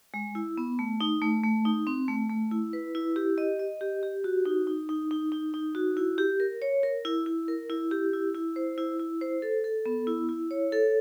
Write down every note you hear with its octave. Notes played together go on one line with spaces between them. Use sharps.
G#3
E4
B3
A3
D#4
A3
A3
D#4
C4
A3
A3
E4
B4
E4
G4
D#5
D#5
G4
G4
F#4
D#4
D#4
D#4
D#4
D#4
D#4
F#4
E4
G4
A#4
C#5
A#4
E4
E4
A#4
E4
G4
E4
E4
C5
E4
E4
C5
A4
A4
B3
E4
E4
C#5
A4